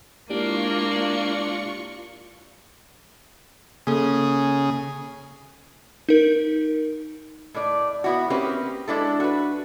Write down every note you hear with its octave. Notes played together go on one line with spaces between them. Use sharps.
G#3 A#3 D4 E4 F4 G4 C#6 C#7
C#3 A#3 G#4 A4
D#4 A#4
A2 D5
B3 E4 F#4
A#3 C4 C#4 G4 B4
G#3 D4 E4 A4
F#4 B4